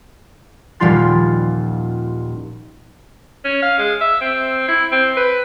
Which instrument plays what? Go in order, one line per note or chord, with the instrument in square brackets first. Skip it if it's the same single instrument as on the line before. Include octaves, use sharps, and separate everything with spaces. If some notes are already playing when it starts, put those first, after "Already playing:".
[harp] D#1 F3 G3 F4 C6 A6
[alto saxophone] C#4
F5
G#3
E5
C4
E4
C4
B4